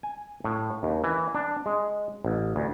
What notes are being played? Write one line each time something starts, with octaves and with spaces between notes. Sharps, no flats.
G#5
A2
D#2
E3
D4
G#3
A1
D2